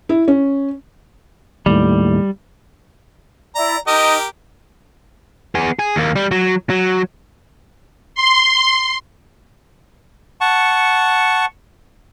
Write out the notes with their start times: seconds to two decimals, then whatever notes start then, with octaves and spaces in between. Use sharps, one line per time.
0.09 E4
0.28 C#4
1.66 D#2 A2 G3
3.55 E4 D5 A#5
3.87 D#4 G4 A#4 D#5
5.55 B3 G#4
5.79 G#4
5.96 D#2 A#3
6.16 G3
6.31 F#3
6.70 F#3
8.15 C6
10.41 F#5 A5 C#6